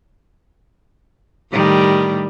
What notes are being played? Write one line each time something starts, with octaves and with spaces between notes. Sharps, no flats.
A2 D#3 G3